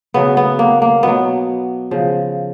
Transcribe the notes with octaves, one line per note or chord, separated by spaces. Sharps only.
C#3 F#3 B3
B3
A#3
A#3
B2 F#3 B3
C#3 F3